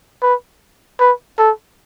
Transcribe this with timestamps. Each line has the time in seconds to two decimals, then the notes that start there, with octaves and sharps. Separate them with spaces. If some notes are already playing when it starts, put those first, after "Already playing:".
0.22 B4
1.00 B4
1.38 A4